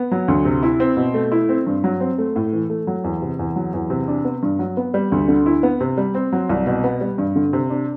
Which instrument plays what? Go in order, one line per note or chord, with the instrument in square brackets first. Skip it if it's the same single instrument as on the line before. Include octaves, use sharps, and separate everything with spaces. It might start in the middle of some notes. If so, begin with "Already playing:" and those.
Already playing: [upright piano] B3
F#3
D2
C3
E4
C4
B2
A3
E4
C4
G2
F#3
C4
A3
A2
E3
A3
F#3
E2
C3
E2
F#3
E2
C3
D4
B3
G2
F#3
B3
G3
D2
D3
E4
B3
C3
G3
C4
F#3
C2
B2
B3
G3
G2
D3
C3
D4